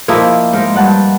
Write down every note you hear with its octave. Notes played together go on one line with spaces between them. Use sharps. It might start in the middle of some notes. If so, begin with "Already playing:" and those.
F3 A#3 E4 D#5
G#2 A#4 F5
G2 F#5 A5